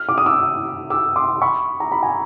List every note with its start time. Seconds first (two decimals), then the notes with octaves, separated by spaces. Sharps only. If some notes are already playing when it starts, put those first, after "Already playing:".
Already playing: F6
0.09 D6
0.18 D#6
0.26 D6 E6
0.90 D6 E6
1.16 C6 D6
1.42 B5 C#6
1.80 A#5
1.92 B5
2.03 G#5 A#5